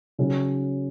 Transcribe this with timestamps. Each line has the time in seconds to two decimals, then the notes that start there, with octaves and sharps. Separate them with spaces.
0.18 C#3 F#3 C#4